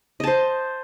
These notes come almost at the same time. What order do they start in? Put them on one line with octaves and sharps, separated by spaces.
D#5 A5 C5